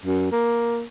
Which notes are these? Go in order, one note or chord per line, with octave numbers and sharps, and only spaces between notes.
F#2
A#3